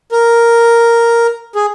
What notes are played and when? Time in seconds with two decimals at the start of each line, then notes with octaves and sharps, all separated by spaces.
0.12 A#4
1.55 G#4